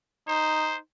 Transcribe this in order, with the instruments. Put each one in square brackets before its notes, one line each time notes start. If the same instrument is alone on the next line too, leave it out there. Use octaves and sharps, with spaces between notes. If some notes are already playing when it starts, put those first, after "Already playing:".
[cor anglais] D#4 [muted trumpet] C5